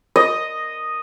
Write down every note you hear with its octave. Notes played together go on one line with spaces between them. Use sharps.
D#5